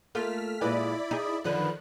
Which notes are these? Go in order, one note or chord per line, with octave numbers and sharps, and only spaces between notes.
A3 A#3 F4 F6 B6
A#2 G#3 E4 B4 D5 B5
D#4 G#4
F#2 D3 D#3 F3 B4 F#6